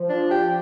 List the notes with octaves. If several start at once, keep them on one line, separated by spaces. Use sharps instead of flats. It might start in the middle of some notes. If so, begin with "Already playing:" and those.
Already playing: F3
D4
G4